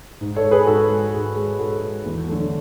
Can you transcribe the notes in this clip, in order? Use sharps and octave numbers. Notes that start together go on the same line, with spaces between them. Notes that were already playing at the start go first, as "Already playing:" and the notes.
G#2
A4 C#5
G#3
G#4 B4
G#2 F#4 A4
G#3
G#2 G#4
G#3
G#2 F#4 A4
G#3
E2
D3 F#3 A3